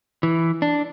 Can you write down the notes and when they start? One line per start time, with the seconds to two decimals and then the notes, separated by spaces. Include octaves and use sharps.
0.23 E3
0.62 D4